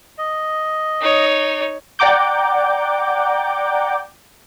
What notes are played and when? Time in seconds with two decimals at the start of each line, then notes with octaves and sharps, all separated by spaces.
0.18 D#5
1.01 D#4 C#5
1.99 D5 F#5 G5 A#5 D6 G6